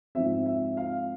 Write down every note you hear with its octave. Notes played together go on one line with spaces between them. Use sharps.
G#2 F3 C4 E5
E5
F5